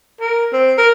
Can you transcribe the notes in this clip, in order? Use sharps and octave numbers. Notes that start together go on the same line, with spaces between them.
A#4
C4
A#4